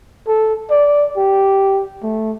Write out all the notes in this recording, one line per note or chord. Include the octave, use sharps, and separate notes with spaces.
A4
D5
G4
A3